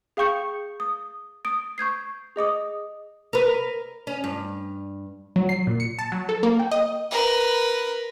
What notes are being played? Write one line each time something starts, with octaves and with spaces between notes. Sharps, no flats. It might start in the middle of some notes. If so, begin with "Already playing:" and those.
G#4 F5 G5 C#6 G6 C#7
D#6
D#6 D7
C#6 G6 G#6 C7
G#4 D#5 D6 D#6
A#4 B4
C#4
G2
F#3
C7
A#2
C#7
A5
F#3
A4
A#3
G5
D#5
A#4 B4